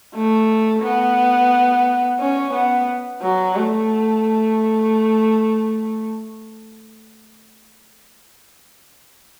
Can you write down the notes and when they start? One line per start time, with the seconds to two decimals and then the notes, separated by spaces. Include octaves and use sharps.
0.15 A3
0.83 B3
2.20 C#4
2.54 B3
3.22 F#3
3.56 A3